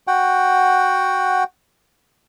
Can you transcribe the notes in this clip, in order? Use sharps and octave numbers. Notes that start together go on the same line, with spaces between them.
F#4 F#5 G5